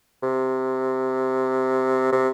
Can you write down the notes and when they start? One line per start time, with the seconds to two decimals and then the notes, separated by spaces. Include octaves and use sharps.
0.23 C3
2.12 C3